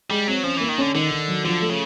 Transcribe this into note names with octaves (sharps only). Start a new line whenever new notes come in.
G3 G#3
F#3 C4
F3 C#4
E3 A#3
D#3
D3 C#4
D3 D#3
D#3
F#3
D3 F3
A3
C#3